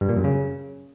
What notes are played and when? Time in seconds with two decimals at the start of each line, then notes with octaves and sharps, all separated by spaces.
0.01 G2
0.09 A#2
0.16 F#2
0.24 C#3